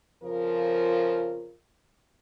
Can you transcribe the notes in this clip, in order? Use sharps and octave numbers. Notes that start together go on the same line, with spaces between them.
F2 C#3 F3 F4 A#4